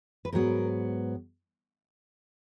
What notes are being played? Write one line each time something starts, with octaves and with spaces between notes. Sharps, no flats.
B4
G#2 F#3 B3 A#4